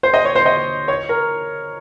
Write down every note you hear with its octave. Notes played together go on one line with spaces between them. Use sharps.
C5
D#5
C#5
C5
D#5
C#5
A#4